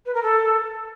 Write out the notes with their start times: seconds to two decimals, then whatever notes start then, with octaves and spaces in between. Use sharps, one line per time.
0.06 B4
0.14 A#4
0.22 A4